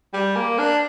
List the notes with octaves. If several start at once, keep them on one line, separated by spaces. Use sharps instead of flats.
G3
A#3
D4